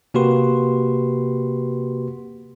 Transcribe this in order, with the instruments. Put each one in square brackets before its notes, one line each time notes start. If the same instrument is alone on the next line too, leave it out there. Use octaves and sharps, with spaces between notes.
[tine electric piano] C3 A#3 F#4 G4 B4 C6